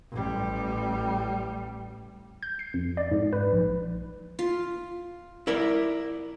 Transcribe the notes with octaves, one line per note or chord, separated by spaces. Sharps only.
A1 G3
G6
C7
F2
D5
G#2
B4
A#1
F4
E4 A#4 D5